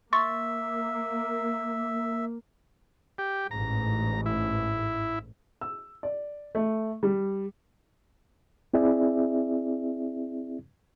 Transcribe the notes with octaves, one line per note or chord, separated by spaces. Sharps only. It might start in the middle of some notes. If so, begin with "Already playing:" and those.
A#3 E5 C6 C#6 A6
G4
A1 G#2 A#5
E4
E6
D5
A3
G3
C4 E4 G#4 D5 E5